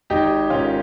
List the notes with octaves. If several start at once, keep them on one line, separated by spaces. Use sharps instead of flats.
G#1 D#4 G4
G#2 D#3 C#4 F4